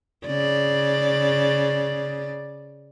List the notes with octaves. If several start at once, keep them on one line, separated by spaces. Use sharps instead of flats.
C#3 D5